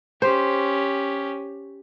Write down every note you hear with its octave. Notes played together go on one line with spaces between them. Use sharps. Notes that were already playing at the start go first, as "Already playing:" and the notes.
C#4 G4 C5